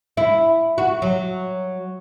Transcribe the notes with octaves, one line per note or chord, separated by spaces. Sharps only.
E4
F#4
F#3